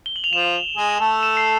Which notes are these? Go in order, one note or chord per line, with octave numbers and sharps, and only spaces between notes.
G7
F#7
F7
F3 F4 E7
G#3 G#4
A3 A4
E7
C7